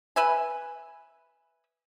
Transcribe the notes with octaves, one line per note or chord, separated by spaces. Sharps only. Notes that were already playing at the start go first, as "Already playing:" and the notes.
B4 E5 G#5